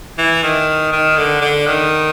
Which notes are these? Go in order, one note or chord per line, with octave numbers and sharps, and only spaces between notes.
E3
D#3
D#3
D3
D3
D#3